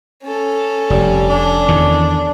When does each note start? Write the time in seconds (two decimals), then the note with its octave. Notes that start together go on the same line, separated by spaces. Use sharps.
0.24 C#4 A4
0.90 F1 G3
1.30 D4
1.68 E2 D#3